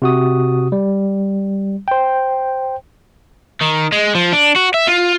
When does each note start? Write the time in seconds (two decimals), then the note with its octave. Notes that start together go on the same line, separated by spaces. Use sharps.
0.02 C3 F#4 D#6
0.72 G3
1.88 C5 G5
3.61 D#3
3.92 G#3
4.15 F3
4.33 D4
4.56 F#4
4.74 E5
4.87 F4